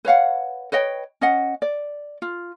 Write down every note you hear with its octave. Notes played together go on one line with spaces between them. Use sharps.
B4 C#5 F5 F#5
B4 C#5 D#5 G5
C#4 D#5 F#5
D5
F4